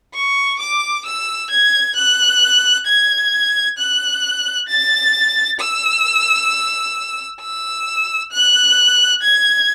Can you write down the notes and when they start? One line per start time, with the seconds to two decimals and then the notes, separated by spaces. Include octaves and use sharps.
0.14 C#6
0.59 D6
1.06 E6
1.51 G#6
1.96 F#6
2.87 G#6
3.78 F#6
4.69 A6
5.60 E6
7.41 E6
8.32 F#6
9.22 G#6